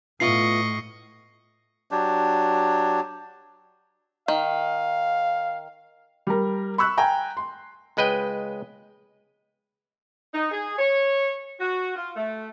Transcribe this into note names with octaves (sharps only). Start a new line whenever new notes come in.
A2 B3 F4 D#5 E5 C#6 C7
F#3 D4 G4
D#3 F5
G3 A#4
B5 C#6 E6 F#6
G5 G#5 A#5
C6
C#2 G#3 B4 D#5 G5
D#4
G#4
C#5
F#4
F4
A3